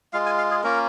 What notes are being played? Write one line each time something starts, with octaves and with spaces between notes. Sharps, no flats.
G#3 F4 F5
G#5
F5
G#4
A#3 C#4 F4 A#4